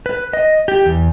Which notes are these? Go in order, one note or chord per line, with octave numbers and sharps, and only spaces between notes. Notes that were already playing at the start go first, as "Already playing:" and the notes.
B4
D#5
G4
E2